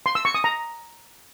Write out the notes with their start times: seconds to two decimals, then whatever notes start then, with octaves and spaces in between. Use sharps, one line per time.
0.06 C6
0.15 E6
0.25 C#6
0.35 D#6
0.44 A#5